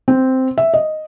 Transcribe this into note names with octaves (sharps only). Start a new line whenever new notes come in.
C4
E5
D#5